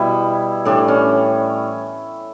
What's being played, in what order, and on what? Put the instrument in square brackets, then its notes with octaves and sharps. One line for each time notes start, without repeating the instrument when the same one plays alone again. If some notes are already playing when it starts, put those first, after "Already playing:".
Already playing: [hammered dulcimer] B2 G3 E4
A2 E3 G3 D4
C#4